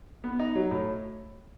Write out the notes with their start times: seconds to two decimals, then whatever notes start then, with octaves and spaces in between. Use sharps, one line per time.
0.24 B3
0.39 D#4
0.55 F#3
0.71 A2